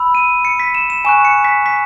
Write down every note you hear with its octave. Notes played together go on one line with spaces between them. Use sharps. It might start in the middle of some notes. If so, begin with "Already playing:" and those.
Already playing: B5 E6
D#7
C#7
B6
E7
E7
G#5 C#6 F#6 E7
C#7
B6
B6